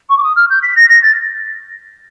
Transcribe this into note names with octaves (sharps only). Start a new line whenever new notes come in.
C#6
D6
D#6
F6
G6
B6
A#6
A#6
A6